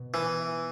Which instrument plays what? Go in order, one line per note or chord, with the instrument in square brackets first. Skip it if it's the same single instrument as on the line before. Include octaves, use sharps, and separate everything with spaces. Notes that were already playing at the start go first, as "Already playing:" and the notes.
Already playing: [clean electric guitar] B2
[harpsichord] E3